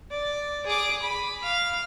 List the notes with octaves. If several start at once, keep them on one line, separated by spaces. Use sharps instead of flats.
D5
G#4 D6
B5
F5